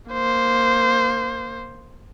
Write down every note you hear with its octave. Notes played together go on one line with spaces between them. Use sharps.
A#3 C5